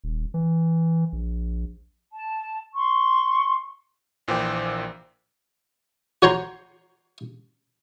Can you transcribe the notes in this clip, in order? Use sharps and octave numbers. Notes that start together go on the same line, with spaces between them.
D#1
E3
A#1
A5
C6 C#6
A#1 A#2 E3 C5 G5 D6
F#4 C#5 G5 A#5 C6